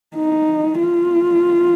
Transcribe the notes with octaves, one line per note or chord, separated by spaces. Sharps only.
D#4
F4